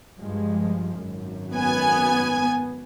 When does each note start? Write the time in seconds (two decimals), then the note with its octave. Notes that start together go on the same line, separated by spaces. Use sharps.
0.19 G2 F3 G#3
0.98 G#1 F#2
1.53 B3 G#5